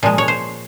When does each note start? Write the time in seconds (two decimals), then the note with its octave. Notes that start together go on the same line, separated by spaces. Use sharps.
0.03 A#2 F3 G#3
0.18 C#5
0.28 C5